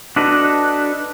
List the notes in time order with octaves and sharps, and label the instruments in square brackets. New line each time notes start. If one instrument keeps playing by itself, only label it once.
[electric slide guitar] D4 F#4 A4 B4 D#5